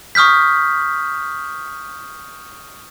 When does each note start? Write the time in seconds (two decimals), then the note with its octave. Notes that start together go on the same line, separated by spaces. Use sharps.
0.15 C#6 D#6 F6 G6 B6